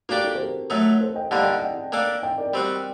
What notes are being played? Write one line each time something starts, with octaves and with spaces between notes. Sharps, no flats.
A#3 D4 F#4 G4 A4 D5
F#4 A4
C5
G4 A#4
F#3 A3 D#4
A4 C5
D#5 G5
D3 G3 A#3 F#5 A5
D#5 G5
D5 F#5
D#5 G5
A#3 D4 A4
D#5 G5
A#4 D5
G3 C4 F#4